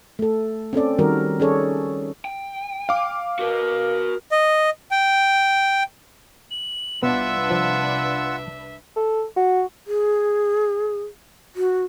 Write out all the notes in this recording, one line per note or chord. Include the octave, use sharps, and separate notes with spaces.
A3 A4
C4 C#4 A4 D5
D#3 G3 F#4 A#4
C#4 D#4 G#4 A4 C#5 D5
G5
F5 D6
F#4 A#4 B4
D#5
G5
F#7
C2 B3 D4 F4 B4 E5 F#5 E6
F3
A4
F#4
G#4
F#4